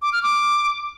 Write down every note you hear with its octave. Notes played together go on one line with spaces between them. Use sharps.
D6
F6
D6